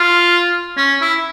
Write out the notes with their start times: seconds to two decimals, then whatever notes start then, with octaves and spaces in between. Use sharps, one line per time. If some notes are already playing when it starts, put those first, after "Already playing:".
Already playing: F4
0.77 C#4
1.01 E4